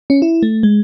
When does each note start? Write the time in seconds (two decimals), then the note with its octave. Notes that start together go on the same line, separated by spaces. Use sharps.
0.10 C#4
0.22 E4
0.43 A3
0.63 G#3